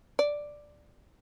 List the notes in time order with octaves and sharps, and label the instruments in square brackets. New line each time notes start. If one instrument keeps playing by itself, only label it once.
[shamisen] D5